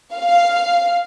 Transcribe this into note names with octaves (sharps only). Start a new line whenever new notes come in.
F5